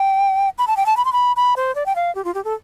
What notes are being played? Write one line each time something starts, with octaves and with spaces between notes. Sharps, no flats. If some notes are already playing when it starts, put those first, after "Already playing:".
Already playing: G5
B5
A5
G5
A5
B5
C6
B5
B5
C5
D5
G5
F5
G4
F4
G4
A4